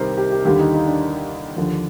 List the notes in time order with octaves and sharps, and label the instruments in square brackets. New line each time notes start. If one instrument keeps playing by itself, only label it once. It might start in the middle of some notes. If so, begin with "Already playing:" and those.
Already playing: [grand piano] C2 C3 D#3 G4 A#4 C5
G4
G4
D#2 D3 G3 G4
D#4
D#4
D4
D#2 D3 F3